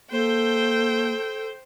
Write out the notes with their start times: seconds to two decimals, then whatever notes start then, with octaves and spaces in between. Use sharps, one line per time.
0.12 A#3 A4 C5 G5